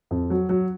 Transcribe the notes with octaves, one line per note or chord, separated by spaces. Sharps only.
F2
F#3
F#3